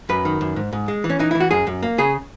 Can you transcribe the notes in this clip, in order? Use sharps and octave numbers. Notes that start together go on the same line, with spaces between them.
F#2 B4
D#3
F#2
G#2
G#2
G#3
E3
C#4
E3 D#4
E3 E4
F#4
F#2 G#4
F#2
A#3
C#3 G#4